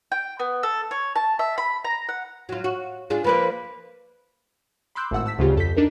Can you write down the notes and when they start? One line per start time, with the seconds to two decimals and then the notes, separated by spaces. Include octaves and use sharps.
0.12 G5
0.39 B3
0.63 A4
0.91 C#5
1.16 A5
1.39 E5
1.58 B5
1.84 A#5
2.09 F#5
2.49 F#3 F4
2.64 F#4
3.10 D4 F4 G#4
3.24 F3 A#3 B4 D5
4.95 B5 C6 D6 E6 F#6 G6
5.11 G#1 A2 F#5 E6
5.26 A5 E6 B6
5.39 D2 C#3 F4 G4
5.56 F2 A4 G6 B6
5.77 D4 D#4 A#4